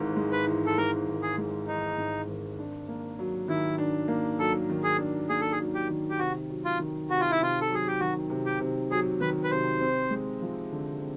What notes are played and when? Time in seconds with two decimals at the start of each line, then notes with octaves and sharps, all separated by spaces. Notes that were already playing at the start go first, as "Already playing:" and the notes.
Already playing: G#1 G#2 E3 G#3
0.16 G#3
0.32 B4
0.47 E3
0.66 A4
0.78 G#2 A#4
1.08 G#1
1.22 G#4
1.38 G#3
1.67 E3 D#4
1.98 G#2
2.27 G#1
2.59 D4
2.88 A#3
3.19 F#3
3.48 D#3 E4
3.78 D4
4.08 A#3
4.39 F#3 A4
4.69 D#3
4.83 G#4
4.98 D4
5.29 A#3 G#4
5.41 A4
5.52 G#4
5.59 F#3
5.74 G4
5.89 D#3
6.10 G4
6.19 C3 F#4
6.49 F#3
6.65 F4
6.80 D#3
7.09 C3 F#4
7.21 F4
7.31 E4
7.40 C3 F4
7.61 A4
7.70 F#3 G#4
7.87 G4
8.00 D#3 F#4
8.30 C3
8.46 G4
8.60 C3
8.91 F#3 G#4
9.20 D#3 B4
9.44 B4
9.51 C3 C5
9.81 C4
10.11 G#3
10.42 F3
10.72 D3
11.02 C4